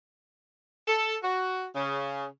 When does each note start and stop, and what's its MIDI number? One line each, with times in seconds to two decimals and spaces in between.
0.88 1.16 69
1.23 1.66 66
1.76 2.26 49